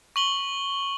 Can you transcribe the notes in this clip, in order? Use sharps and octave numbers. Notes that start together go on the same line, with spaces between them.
C#6 F#7 G7